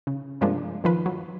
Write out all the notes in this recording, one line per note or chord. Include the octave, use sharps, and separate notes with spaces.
C#3
G2 C3 F3 G#3 A#3 D4
D#3 F3 B4
F#3